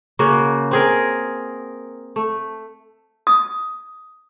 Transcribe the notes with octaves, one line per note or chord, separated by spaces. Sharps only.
C#3 A#3 F#4
C4 G#4 A#4
A3
D#6